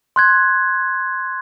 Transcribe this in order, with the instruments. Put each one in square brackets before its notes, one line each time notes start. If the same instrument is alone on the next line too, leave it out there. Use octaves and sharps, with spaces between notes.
[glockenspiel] C6 F#6 G#6